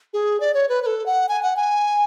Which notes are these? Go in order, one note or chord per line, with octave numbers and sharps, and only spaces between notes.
G#4
D5
C#5
B4
B4
A4
F#5
G#5
F#5
G#5